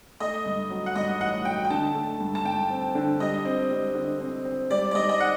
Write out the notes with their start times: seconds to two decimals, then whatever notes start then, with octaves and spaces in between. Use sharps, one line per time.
0.20 A3 D#5
0.46 G2
0.70 F#3
0.86 F#5
0.96 G2 D#5
1.20 A1 F#5
1.45 F#3 G5
1.65 G5
1.70 D3 A5
1.95 A3
2.20 G2
2.35 A5
2.45 G2 G5
2.70 C4
2.95 D3
3.20 G3 D#5
3.45 C4
3.71 G3
3.95 D3
4.21 C4
4.45 C4
4.70 G3 D5
4.91 D5
4.95 G3 D#5
5.09 D#5
5.20 F#5